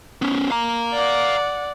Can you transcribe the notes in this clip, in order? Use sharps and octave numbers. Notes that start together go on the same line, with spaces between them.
B3 C#4
F5 A#5
D5 F#5